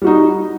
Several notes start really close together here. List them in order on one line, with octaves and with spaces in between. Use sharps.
G3 F#4 D#4